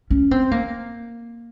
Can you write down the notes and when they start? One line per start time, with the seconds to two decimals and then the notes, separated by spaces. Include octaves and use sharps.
0.10 C#4
0.31 C4
0.51 A#3